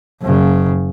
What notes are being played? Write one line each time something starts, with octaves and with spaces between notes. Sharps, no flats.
F#1 C#3